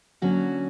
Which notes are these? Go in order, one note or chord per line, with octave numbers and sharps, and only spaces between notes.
D3 F#3 A#3 C#4 F#4